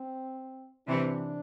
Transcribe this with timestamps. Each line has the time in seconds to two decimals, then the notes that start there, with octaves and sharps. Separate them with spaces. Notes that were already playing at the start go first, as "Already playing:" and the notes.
Already playing: C4
0.87 C3 E3 D4